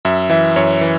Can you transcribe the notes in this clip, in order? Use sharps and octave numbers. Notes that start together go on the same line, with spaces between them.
F#2 E5
E3 E5
F#2 C#5
E3